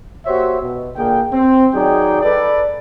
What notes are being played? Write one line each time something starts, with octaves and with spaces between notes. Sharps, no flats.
A#3 F#4 G4 C5 C#5 E5
B2
A#2 D3 A#3 G#4 G5
C4
D#3 F#3 D#4 G#4 D5 G5
A4 B4 D5